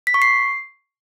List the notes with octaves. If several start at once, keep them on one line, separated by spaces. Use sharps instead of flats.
B6
C#6
C7